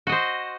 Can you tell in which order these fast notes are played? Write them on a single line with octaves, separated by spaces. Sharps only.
F#4 D#5 C5